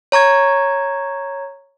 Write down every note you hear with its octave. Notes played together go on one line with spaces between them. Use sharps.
C#5 A#5 C#6 G#6